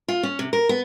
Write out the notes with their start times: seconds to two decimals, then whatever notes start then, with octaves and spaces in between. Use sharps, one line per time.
0.08 F4
0.23 C#4
0.39 C3
0.53 A#4
0.69 B3